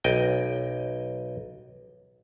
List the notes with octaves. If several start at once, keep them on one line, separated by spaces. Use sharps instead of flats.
B1 D#5 G5